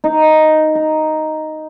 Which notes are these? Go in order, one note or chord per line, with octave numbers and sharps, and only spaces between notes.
D#4
A#5